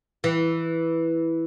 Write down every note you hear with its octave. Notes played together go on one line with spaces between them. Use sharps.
E3